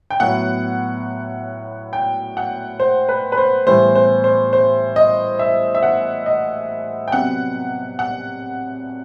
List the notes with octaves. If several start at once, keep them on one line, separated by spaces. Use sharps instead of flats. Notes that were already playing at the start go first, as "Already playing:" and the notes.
G5
A2 F#3 B3 F#5
G5
F#5
C5
B4
B4
C5
A2 E3 G3 B3 C5
C5
C5
C5
D#5
E5
E5
F#5
D#5
G5
C3 F#3 B3 F#5
F#5